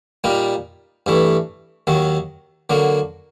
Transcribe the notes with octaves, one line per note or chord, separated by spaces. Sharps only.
A#2 G3 A#3 D#4
G2 E3 A3
D#2 D#3 F#3
D3 F#3 A#3